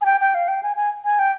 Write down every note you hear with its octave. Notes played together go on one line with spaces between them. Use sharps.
G#5
G5
G5
F5
G5
G#5
G#5
G#5
G5